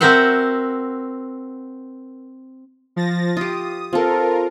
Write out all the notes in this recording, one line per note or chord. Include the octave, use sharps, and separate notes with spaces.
C4 F#4 A#4 C5 E5 F#5
F3 A6 A#6
F4 G4 D#6
C4 F4 A4 A#4